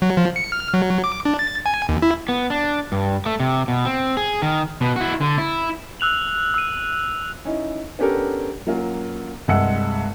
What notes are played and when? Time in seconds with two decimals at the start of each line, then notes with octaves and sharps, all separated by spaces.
0.02 F#3
0.17 F3
0.36 C#7
0.52 F6
0.74 F#3
1.04 D6
1.25 D4
1.39 A6
1.66 G#5
1.89 D#2
2.02 E4
2.29 B3
2.50 D4
2.92 G2
3.26 A3
3.40 C3
3.68 B2
3.85 C4
4.17 G#4
4.42 D#3
4.81 B2
4.96 E4 F#4
5.21 D3
5.38 E4
6.00 E6 F#6 F7 F#7
6.54 E6 D#7
7.45 C#4 D#4 E4
7.99 B3 C#4 D4 G4 A4 A#4
8.67 F#3 A#3 C#4 F4 F#4
9.48 C2 G2 G#3 F#5 E6 C#7